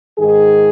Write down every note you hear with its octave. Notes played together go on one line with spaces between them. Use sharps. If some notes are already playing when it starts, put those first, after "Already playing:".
G#2 D#3 G#4